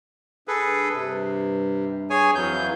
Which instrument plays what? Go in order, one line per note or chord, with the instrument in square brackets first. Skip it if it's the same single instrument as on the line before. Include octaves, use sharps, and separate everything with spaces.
[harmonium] G2 [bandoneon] G#4 A4 B4
[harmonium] G2 [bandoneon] C3
[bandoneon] G#4 C#5 G#5
[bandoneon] F2 F#3 G6 [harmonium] E3 F5